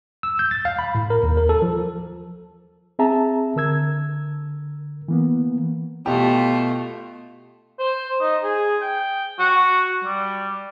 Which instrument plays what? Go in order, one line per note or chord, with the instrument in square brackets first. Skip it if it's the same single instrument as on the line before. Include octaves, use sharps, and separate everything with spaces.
[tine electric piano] E6
G6
A6
F5
B5
A2
A#4
D#2
A#4
A4
F3
[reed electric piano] C4 G#4 E5 A5 A#5
D3 A#4 E6 G#6
E3 A#3 B3
[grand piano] B2 G4 [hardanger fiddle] A3 F4
[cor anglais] C5
D#4
G#4
G5
F#4
G3